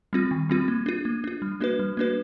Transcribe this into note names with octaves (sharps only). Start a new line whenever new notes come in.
G3 C4 F4
D#3
G3 C4 F4
A#3
D4 F4
A#3
D4 F4
G3
A#3 D4 F#4 B4
G3
A#3 D4 F#4 B4